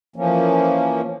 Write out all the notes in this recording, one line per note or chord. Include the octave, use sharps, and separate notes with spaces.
E3 F3 A#3 C#4